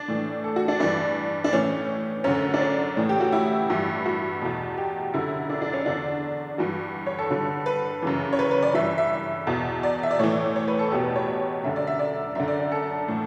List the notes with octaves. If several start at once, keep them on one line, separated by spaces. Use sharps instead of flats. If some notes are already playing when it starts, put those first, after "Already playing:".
Already playing: D4
A2 E3
A4
F#4
D4
G2 E3 D4
D4
A2 E3 C#4
F#2 D3 C#4
D4
C#4
A2 E3
G4
F#4
E4
G2 E3
F#4
E2 B2
G4
F#2 D3 E4
D4
D4
C#4
E2 D3 D4
G2 E3 F#4
C#5
A4
G2 D3
B4
F#2 C#3 E3
C#5
B4
B4
D5
G2 E3 E5
E5
E2 B2
D5
E5
D5
A2 E3 C#5
C#5
B4
A4
E2 B2 G4
B4
C#5
F#2 D3 E5
D5
E5
D5
F#2 D3 E5
D5
D5
A4
A2 E3